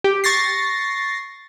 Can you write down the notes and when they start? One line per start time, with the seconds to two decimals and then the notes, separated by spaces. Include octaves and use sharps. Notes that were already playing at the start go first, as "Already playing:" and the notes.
0.04 G4
0.24 C#6 A6 A#6 C7